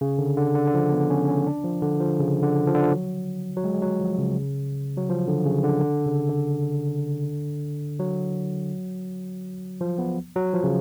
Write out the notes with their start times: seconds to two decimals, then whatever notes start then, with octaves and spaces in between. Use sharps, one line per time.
0.01 C#3
0.19 D3
0.37 D3
0.56 D3
0.68 D3
0.74 F3
0.92 B3
1.10 C#4
1.28 C#4
1.47 D4
1.64 F3
1.82 D3
2.00 F3
2.19 C#3
2.43 D3
2.67 F3
2.74 D3
2.82 F3
2.92 F#3
3.56 F#3
3.64 G#3
3.74 G#3
3.82 F#3
4.00 F3
4.18 C#3
4.97 F#3
5.10 F3
5.27 D3
5.45 C#3
5.63 D3
5.82 D3
6.06 C#3
6.30 D3
7.99 F#3
9.81 F3
9.98 B3
10.36 F#3
10.54 F3
10.64 C#3